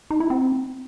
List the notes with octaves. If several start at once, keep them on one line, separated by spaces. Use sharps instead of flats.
D#4
E4
C4